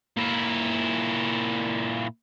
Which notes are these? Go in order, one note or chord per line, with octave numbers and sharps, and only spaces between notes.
A#2 E4